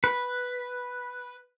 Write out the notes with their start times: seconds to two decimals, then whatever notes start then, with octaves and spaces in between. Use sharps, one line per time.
0.04 B4